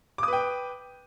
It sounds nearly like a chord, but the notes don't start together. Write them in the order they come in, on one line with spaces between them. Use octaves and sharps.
D6 D#6 B4 G5